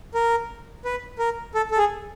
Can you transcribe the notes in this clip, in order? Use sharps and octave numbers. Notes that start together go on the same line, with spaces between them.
A#4
B4
A#4
A4
A4
G#4